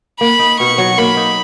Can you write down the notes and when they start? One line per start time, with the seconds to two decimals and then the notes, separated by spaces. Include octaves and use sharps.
0.20 A#3 B5
0.39 D#4
0.59 B2 C#6
0.78 F#3
0.98 A#3 B5
1.17 D#4